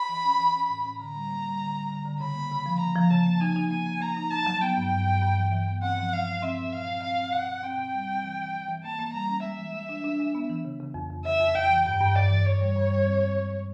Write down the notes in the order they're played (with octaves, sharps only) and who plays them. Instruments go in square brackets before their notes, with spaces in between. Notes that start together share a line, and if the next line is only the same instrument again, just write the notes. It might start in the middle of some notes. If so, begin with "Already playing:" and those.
Already playing: [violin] B5
[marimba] E3
C#4
E3
C#4
A2
C#4
[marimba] D3 [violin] A#5
[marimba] G3
A#3
G3
D3
G3
D3
D3
[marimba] C#3 [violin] B5
[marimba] A#3
C#3
F3
[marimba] A#3 [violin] A#5
[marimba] F3
[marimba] C#3 [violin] A5
[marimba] A#3
[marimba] D#4 [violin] G#5
[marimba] D#4
[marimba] A#3 [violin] G#5
[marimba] A#3
[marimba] A#3 [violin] A#5
[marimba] D#4
[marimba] D#4 [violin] A5
[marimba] F#3
[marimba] B3 [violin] G5
[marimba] G2
G2
G2
G2
E3
E3
B3
[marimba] C4 [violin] F#5
[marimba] F3
[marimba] G#3 [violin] F5
[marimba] G#3
[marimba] C4 [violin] E5
[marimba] A#2
[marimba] C4 [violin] F5
[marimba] C4
[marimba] C4 [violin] F5
[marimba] C4
[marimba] B2 [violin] F#5
[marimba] B2
[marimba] C4 [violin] G5
[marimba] B2
G3
C4
E3
E3
E3
E3
[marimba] A#3 [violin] A5
[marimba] A#3
[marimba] G3 [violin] A#5
[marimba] C#4
[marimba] G#3 [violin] E5
[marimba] E3
G#3
D4
D4
G#3
B3
E3
C#3
C#3
F2
F2
[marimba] C#3 [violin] E5
[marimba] F2
[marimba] F2 [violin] G5
[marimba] E3
[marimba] G2 [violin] G5
[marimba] G2
[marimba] G2 [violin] D5
[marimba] E3
[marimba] G2 [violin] C#5
[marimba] G3
G2
G3
C4
G#3
G#3
G#3